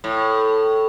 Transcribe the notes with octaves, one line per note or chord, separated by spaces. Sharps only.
A2